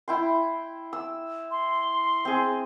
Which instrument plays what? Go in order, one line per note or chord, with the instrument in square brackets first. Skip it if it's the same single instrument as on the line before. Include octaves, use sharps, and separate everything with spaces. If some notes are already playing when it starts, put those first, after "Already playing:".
[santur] E4 G5 C6
E6
[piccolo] C6
[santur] C4 G#4